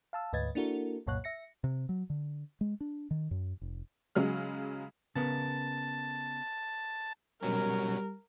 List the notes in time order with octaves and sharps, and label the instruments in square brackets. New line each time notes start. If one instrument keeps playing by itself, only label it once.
[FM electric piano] F5 A5 E6
D2 G#2 B4 D#5 G#6 A6
A#3 D4 E4 F#4 A4 A#4
C2 F#2 A#2 C#5 F#5 F#6
E5 A#6 C#7
[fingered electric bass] C3
F#3
D3
G#3
D4
D#3
F#2
F1
[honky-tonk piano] C#3 F#3 G#3 F6
[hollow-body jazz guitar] C#3 B3 A#4 [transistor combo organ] A5
[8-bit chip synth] B2 F#3 C#4 [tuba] G3 [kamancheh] A#4